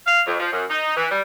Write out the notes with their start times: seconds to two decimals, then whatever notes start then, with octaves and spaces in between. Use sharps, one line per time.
0.07 F5
0.26 F2
0.40 F3
0.53 F#2
0.70 D#4
0.96 E3
1.10 G3